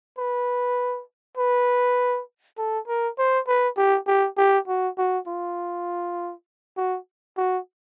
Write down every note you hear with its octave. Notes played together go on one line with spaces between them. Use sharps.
B4
B4
A4
A#4
C5
B4
G4
G4
G4
F#4
F#4
F4
F#4
F#4